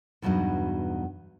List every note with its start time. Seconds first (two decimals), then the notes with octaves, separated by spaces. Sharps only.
0.22 E2 G2 B2 F#3 D#4